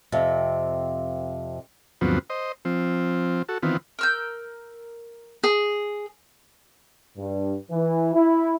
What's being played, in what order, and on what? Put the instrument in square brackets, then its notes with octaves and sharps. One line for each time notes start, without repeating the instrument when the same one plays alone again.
[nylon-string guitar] F2 C3
[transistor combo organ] D2 G2 F3 F#3 B3 C4
C5 D#5
F3 C4
F#4 A4
D#3 E3 B3 C4 F4
[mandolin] A#4 E6 G6
[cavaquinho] G#4
[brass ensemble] G2
E3
E4